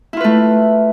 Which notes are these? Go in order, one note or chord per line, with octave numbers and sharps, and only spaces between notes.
A3 E4 F4 B4